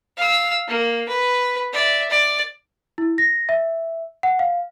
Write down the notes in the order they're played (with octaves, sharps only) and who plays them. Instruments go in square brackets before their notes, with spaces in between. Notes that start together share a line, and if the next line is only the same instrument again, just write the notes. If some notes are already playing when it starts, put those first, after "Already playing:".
[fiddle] F5 E6
A#3
B4
D5 E5
D5
[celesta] E4
A#6
E5
F#5
F5